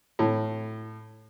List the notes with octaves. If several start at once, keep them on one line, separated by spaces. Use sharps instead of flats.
A2